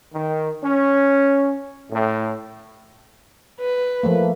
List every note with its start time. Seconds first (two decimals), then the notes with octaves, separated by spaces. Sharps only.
0.14 D#3
0.64 C#4
1.91 A2
3.61 B4
4.03 F3 A3 A#3